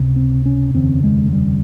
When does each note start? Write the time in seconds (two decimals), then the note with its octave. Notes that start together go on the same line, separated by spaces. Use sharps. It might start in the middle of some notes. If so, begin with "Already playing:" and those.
Already playing: C#2 C3
0.16 C4
0.46 C#4
0.74 F1 D#2 C#3 C4
1.04 G#3
1.33 G3